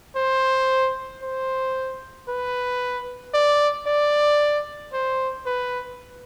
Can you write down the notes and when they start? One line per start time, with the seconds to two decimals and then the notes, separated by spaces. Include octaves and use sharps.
0.16 C5
1.23 C5
2.28 B4
3.34 D5
3.87 D5
4.93 C5
5.46 B4